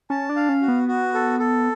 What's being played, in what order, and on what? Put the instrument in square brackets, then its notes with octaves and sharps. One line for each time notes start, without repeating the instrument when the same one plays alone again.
[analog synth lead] C#4 [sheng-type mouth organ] A5
[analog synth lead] D4
[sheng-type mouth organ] F5
[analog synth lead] C#4
[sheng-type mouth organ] F#4
[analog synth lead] B3
[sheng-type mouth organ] F#4
A4
A4